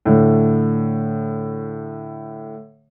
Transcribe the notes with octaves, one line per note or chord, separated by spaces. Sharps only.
A2 D3